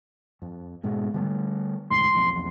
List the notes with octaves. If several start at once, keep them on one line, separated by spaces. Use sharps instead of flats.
F2
G#2 B2 G#3
D3 G3 A3
E1 D2 G#2 C6
E1 B1 F2